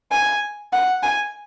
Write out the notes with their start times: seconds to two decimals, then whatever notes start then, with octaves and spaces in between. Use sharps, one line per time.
0.12 G#5
0.73 F#5
1.03 G#5